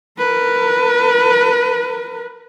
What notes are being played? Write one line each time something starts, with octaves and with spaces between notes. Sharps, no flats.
A#4 B4